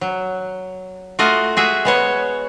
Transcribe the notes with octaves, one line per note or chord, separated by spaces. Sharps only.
F#3
A3 F4 F#4 D#5
F#4 G#4 E5
G#3 B3 C#5